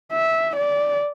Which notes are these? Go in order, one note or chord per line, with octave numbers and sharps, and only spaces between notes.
E5
D5